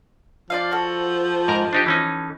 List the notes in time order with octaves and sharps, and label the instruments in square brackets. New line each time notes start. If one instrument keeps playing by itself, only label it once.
[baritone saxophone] F3 [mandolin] D5 D#5 F5
[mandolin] F#4 A4
[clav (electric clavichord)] G#2 A#4 A#5
D4 D#4 G4
E3 C#4 D#4